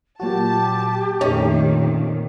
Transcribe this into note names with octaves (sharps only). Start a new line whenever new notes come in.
A#2 F#3 F#4 G4 A5
F2 A#2 D#3 A3 C#4 D#4